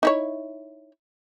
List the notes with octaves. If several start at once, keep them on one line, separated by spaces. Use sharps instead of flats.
D#4 E4 C#5